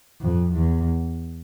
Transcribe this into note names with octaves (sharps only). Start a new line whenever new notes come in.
F2
E2